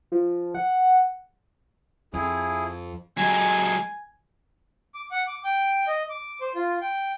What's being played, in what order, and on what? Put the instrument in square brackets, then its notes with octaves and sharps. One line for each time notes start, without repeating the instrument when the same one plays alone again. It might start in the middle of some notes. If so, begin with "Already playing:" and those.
[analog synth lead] F3
F#5
[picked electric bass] F2 [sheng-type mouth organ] E4 G#4
[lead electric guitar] F#3 G#3 [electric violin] G#5
[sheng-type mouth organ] D6
F#5
D6
G5
D#5
D6
C5
F4
G5